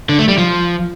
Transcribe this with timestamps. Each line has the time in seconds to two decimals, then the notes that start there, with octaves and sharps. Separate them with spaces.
0.09 D3
0.19 A3
0.28 G3
0.38 F3